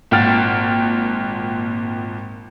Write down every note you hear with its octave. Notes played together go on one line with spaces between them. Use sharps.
G#1 A#2 F#5 G5 F6 A6